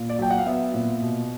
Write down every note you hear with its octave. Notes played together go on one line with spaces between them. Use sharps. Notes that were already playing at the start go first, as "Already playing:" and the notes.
Already playing: A#2
D5
F#3 G5
F#5
F5
B3 E5
A#2
B2